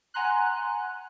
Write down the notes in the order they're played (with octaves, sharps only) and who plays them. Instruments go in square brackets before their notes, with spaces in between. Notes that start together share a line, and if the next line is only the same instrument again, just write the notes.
[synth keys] F#5 G#5 A#5 C6 F#6